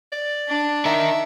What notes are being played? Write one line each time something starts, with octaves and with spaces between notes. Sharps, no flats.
D5
D4
D#4 A#4 E5